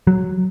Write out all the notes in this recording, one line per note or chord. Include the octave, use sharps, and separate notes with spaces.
F#3